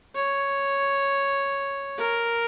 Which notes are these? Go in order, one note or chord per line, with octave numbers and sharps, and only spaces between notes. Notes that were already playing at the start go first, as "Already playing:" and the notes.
C#5
A#4